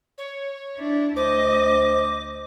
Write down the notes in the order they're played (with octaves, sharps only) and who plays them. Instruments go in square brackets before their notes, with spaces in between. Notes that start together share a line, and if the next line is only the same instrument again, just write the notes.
[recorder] C#5
[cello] D4 E4
[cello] D2 D#5 [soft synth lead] C5 [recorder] D6